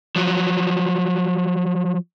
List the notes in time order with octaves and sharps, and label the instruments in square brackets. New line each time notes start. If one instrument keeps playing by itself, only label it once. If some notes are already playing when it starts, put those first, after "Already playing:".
[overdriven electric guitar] F3 F#3